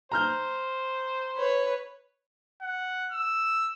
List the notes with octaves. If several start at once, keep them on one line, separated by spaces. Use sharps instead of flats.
C5 A#5 F6 G6
B4 C#5
F#5
E6